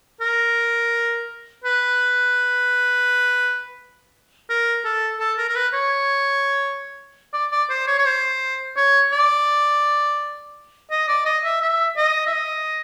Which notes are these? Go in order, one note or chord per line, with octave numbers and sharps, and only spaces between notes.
A#4
B4
A#4
A4
A4
A#4
A#4
B4
C#5
D5
D5
C5
C#5
C#5
C5
C#5
D5
D#5
D5
D#5
E5
E5
D#5
E5
D#5